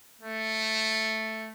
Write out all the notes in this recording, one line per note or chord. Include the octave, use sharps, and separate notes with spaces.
A3